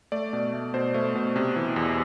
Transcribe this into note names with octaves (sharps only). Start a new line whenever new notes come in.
A3 D5
B2
A3
B2 C5
A3
B2
C3
E3
E2